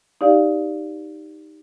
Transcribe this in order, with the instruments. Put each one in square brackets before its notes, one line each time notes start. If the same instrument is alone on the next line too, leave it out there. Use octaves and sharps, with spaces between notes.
[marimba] D#4 G4 D5 F5